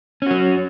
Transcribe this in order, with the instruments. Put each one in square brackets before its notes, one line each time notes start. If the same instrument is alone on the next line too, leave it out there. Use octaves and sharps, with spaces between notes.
[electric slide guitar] C#4
F#4
F#3